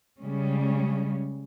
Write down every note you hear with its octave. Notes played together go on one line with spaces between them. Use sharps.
C#3 G3 G#3 C#4